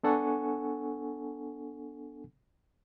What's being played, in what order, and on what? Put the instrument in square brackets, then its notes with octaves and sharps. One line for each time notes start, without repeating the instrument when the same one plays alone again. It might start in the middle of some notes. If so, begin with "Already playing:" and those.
[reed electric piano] B3 D4 A4 F#5 G#5 C#6